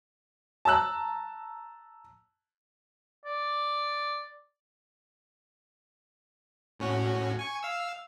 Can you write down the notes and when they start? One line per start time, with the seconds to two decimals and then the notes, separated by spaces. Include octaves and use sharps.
0.65 A5 A#5 E6 F#6
3.25 D5
6.80 A2 C#4 F#4
7.39 G#5 C#6
7.63 F5 E6